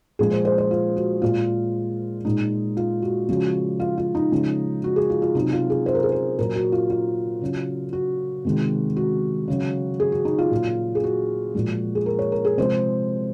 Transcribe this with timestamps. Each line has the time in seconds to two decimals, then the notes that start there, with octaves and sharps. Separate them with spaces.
0.19 A#2 F3 G#3 G#4
0.31 C5
0.45 C5
0.58 C5
0.71 F4
0.97 F#4
1.22 A#2 G#3 F4
2.25 A#2 G#3 D#4
2.77 F4
3.02 F#4
3.29 C#3 F3 G#3 F#4
3.80 F4
3.98 F4
4.15 D#4
4.32 C#3 F3 G#3
4.84 F#4
4.96 G#4
5.10 F4
5.22 F4
5.35 C3 F#3 D#4
5.53 F4
5.70 G#4
5.86 C5
5.95 A#4
6.03 G#4
6.12 A#4
6.38 A#2 F#3 A#4
6.56 F#4
6.72 F4
6.90 F4
7.41 C#3 F#3
7.93 F#4
8.45 C3 D#3 G#3
8.96 F#4
9.48 C#3 F#3
10.00 G#4
10.12 F#4
10.25 D#4
10.38 F4
10.51 A#2 F#3
10.95 G#4
11.04 F#4
11.55 A#2 F3 G#3
11.95 G#4
12.06 A#4
12.19 C#5
12.32 A#4
12.45 G#4
12.57 C3 F3 G#3 C5